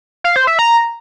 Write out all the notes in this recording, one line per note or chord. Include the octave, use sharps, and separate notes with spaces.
F5
C5
E5
A#5